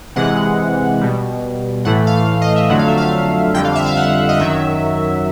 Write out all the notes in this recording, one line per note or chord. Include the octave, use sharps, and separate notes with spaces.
C3 E3 G#3 F#5
B2 G3
A2 E3 A3 F#5
F5
D#5
E5
F2 D3 F#3 A3 F#5
F5
E5
F5
F2 D3 G3 G5
F5
E5
F5
F#5
D#5
F#2 D#3 F#3 E5